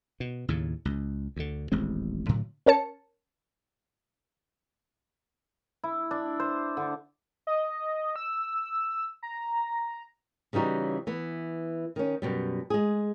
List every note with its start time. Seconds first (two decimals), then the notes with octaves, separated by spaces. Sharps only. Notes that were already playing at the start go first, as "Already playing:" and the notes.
0.20 B2
0.48 D#2 A2 C#3
0.85 C#2
1.36 D2 D3
1.72 D#1 A1 G#3 C4
2.29 A2 D3 F#3
2.66 C#4 A#4 C#5 A5 C#7
5.83 E4
6.11 D4
6.40 C5
6.77 D3
7.47 D#5
8.16 E6
9.23 A#5
10.53 C#3 E3 G3 D#4 F#4
11.07 E3 B3
11.96 D#3 C#4
12.22 F#2 B2 G3
12.70 G#3 G#4